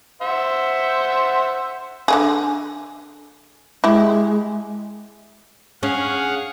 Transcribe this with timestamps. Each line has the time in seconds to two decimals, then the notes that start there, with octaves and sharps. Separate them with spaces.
0.21 C5 E5 F#5
2.08 D3 E3 G#4
3.84 G#3 E4 G4
5.83 C#4 G#4 F5 F#5